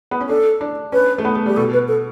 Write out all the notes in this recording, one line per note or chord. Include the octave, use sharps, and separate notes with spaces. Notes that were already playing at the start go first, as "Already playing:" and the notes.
B3
C#4
D4 A4
D4
C#4 B4
A3
B3
A3
G3 G4
B2 A4
B4
A4